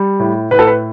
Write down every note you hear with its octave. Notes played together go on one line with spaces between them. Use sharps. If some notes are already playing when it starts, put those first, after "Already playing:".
Already playing: G3
A2
A2 B4
A4
B4